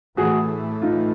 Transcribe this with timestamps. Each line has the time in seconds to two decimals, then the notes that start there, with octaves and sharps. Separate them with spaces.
0.17 A2 E3 A3 F#4 G#4
0.82 D#4 F4